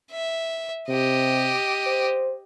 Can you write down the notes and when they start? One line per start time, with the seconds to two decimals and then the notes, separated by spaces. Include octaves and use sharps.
0.12 E5
0.89 C3 G4 D#5
1.86 C5